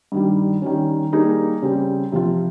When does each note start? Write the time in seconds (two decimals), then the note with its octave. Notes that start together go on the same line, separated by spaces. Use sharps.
0.12 G2 D#3 G3
0.62 D#3 G3 C#4
1.12 G3 A#3 D#4 G#4
1.62 C#3 G3 C4
2.12 C3 F3 C4 F4